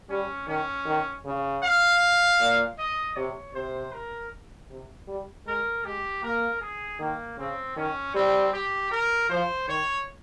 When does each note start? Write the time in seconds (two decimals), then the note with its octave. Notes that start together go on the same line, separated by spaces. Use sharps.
0.10 G3 C#4
0.48 D#3 C#4
0.86 D#3
1.26 C#3
1.63 F5
2.40 A#2
2.79 D#5
3.16 C3 C#5
3.55 C3 C5
3.93 A#4
4.70 C3
5.08 G3
5.46 G#3 A#4
5.84 G#3 G4
6.23 A#3 A#4
6.61 G#4
7.00 D#3 A#3
7.38 C#3 C4
7.76 D#3 C#4
8.15 G3 C4
8.53 G4
8.91 A#4
9.30 F3 C5
9.68 D#3 C#5